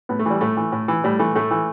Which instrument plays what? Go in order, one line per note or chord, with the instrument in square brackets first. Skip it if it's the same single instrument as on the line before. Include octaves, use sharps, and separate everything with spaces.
[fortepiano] A2 B3
A3
E3 G3
A2 A3
E3
A2
E3
A2 G3
E3 A3
A2 A3
E3